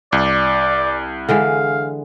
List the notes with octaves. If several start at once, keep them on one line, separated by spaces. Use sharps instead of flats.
C2 D5
D3 E3 G#3 F5